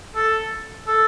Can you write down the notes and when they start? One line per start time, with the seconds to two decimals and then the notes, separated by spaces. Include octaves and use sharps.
0.15 A4
0.87 A4